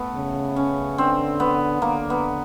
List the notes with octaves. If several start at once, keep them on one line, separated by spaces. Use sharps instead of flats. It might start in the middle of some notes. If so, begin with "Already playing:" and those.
Already playing: A3 B3
C#3
C#4
D3 C4
B3
D3 A#3
B3